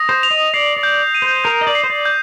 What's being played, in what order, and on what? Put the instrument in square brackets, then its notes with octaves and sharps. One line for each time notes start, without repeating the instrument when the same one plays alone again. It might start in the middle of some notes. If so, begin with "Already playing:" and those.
Already playing: [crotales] D#6 A#6
[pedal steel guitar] C5
[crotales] F7
[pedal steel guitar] D#5
[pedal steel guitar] D5 [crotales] C7
[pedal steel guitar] D5
[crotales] G6
D#7
[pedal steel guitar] C5
[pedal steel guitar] A#4 [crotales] G6
[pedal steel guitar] D#5
D5
[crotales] C7
[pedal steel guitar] C5
D5
[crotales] G6